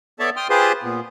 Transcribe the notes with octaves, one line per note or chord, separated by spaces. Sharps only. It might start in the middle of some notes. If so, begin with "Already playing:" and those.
B3 A4 C#5 D5 E5 A5
G5 C6 D#6 F6
F4 G4 G#4 B4 C5 C6
A#2 B3